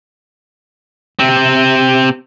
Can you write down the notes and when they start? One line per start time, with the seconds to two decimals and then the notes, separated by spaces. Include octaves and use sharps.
1.19 C3 C4